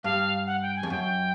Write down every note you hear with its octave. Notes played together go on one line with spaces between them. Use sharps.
G2 F5
F#5
G5
G#5
F2
F#2 G5